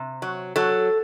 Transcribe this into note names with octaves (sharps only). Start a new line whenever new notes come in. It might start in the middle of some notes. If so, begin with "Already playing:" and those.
Already playing: C3
F#3
F#3 A4